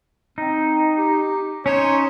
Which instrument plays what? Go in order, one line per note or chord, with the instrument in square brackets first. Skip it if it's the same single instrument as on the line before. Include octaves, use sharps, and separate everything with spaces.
[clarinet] C4 [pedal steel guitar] D#4
[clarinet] G4
[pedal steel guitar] C#4 D#4 C5 [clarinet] C#5